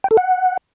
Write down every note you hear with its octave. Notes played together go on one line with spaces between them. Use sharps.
G5
A4
F#5